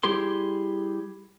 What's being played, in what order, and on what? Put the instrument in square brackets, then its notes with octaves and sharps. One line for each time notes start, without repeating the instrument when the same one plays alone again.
[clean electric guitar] G3 E4 G4 G#4 C6